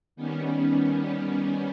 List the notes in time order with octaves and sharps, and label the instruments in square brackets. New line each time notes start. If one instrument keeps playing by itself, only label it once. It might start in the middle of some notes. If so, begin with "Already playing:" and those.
[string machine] D#3 G3 B3 C#4